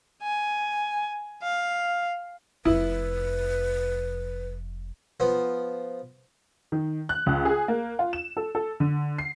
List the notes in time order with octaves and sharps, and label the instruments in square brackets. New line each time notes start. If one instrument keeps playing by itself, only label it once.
[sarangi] G#5
F5
[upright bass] F1 F2 [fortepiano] E4 [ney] B4
[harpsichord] F3 B3
[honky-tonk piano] D#3
F#6
C#2
G#4
A#3
F4
E7
A4
A4
D3
C7